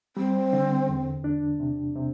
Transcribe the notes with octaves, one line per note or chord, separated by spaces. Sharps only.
G3 C4
D3
E2
D4
C3
C3